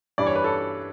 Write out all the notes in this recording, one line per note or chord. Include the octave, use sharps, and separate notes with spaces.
G2 E3 G3 D5
C#5
B4
A4 C#5